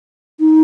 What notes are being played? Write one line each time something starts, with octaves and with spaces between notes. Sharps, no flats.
D#4